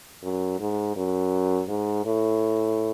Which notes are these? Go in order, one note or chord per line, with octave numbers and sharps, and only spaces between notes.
F#2
G#2
F#2
G#2
A2